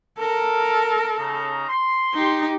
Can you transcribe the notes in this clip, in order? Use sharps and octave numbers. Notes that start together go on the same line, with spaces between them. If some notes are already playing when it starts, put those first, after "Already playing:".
A4 A#4
C#3 D#4 A#5
C6
D#4 G4